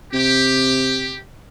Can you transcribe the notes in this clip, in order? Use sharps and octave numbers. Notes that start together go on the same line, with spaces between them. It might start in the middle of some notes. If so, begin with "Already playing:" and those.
C3 G4